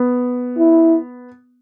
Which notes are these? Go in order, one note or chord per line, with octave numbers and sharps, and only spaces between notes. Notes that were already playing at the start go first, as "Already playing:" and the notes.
Already playing: B3
E4